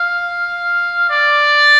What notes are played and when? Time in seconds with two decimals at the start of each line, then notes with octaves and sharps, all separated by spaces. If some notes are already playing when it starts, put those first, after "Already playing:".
Already playing: F5
1.10 D5